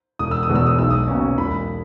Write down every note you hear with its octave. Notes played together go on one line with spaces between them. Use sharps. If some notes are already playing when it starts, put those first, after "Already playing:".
E1 D#6
E6
D#6
E2 B2 G#3
E6
D#6
B1 E6
D#6
B2 A#3 C#4
E1 B5